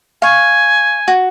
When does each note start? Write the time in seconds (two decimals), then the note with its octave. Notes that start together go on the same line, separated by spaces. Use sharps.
0.22 F5 G#5 C#6
1.08 F#4